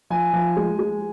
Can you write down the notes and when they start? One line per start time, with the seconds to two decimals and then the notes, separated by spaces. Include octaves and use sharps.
0.10 F3 G#5
0.33 F3
0.57 G#3
0.79 G#3